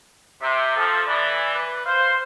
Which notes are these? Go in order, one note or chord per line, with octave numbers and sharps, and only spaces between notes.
C3 E5
F3 A4
E3 D5
B4
C5 F5